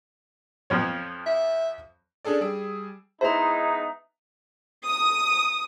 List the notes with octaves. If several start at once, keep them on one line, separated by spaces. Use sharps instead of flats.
F2 F3 C#5
E5
C#4 D4 G#4 A4 D5
G3 G#4 E6 D7
G#3 B3 D#4 E4 C5 E5 A#5
D#6